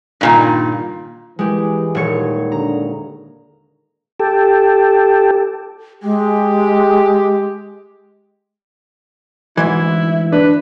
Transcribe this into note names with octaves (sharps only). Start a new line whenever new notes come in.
G2 A#2 D#3
E3 G#3 G4
D#1 C#5 C#7
D3 A#5
G4 A4
G#3 G4
D2 G#2 E3 E4
D4 B4